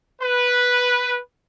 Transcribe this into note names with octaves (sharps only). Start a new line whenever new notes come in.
B4